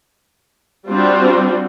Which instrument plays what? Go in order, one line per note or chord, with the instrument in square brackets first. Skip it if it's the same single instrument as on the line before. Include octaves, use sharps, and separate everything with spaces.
[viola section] G3 C4 D4 F4 F#4